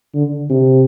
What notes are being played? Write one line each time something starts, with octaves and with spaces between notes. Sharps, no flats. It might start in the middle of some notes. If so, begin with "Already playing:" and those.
D3
C3